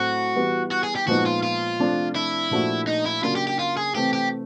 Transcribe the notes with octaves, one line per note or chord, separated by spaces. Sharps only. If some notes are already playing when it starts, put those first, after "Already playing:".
Already playing: A2 F#3 A3 C4 F#4
E3 G3 B3 E4
F#4
G#4
G4
A#2 F3 G#3 B3 D#4 F#4
F4
F4
C3 F3 A3 D4
E4
A#2 F3 A3 D4 F#4
D#4
E4
C#3 F#3 A#3 D4 F4
G4
G4
F4
G#4
C3 E3 A3 C4 G4
G4